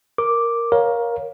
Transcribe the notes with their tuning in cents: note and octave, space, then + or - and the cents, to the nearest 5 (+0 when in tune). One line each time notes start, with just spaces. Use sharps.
A#4 +0 D6 +0
A#4 +15 C#5 +0 F5 +10